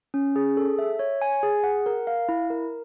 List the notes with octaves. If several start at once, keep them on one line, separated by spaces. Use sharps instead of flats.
C#4
G#4
A4
E5
C#5
G#5
G#4
F#5
A#4
F5
E4
A#4